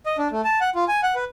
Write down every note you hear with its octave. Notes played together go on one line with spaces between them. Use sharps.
D#5
D4
A3
A5
F#5
F4
G#5
F#5
B4